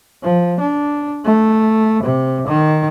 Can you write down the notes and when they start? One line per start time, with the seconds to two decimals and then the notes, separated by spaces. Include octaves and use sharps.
0.23 F3
0.60 D4
1.25 A3
2.03 C3
2.47 D#3